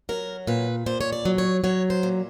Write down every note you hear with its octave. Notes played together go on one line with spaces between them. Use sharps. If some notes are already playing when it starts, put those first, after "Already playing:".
F#3 A#4
A#2 B4
A#2 C5
C#5
D5
F#3
C#5
F#3 C#5
C5
A#2